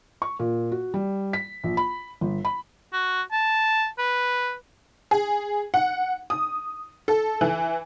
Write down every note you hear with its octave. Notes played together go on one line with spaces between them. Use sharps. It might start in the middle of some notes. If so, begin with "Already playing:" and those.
C#6
A#2
F#4
G3
B6
A#1
B5
G1
B5
F#4
A5
B4
G#4
F#5
D#6
A4
E3